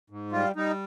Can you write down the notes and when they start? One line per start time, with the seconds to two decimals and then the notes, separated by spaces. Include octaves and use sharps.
0.10 G#2
0.32 G3 F4
0.56 G3 D#4